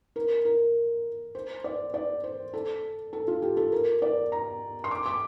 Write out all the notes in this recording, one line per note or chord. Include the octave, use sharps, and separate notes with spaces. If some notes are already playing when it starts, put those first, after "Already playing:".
A#4
A#4
C5
D5
D5
C5
A4
A4
F4
G4
A4
A#4
D5
A#5
C6
D6
D6